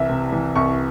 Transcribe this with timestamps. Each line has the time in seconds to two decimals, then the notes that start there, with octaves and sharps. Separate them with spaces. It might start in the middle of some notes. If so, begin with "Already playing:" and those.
Already playing: C2 E3 E5
0.10 C3
0.33 E3
0.56 C2 C#6